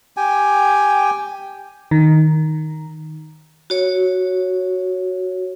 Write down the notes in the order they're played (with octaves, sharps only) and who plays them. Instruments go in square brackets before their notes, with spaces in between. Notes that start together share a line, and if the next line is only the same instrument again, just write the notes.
[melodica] G4 G5 G#5
[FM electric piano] D#3
[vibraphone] F#4 C#5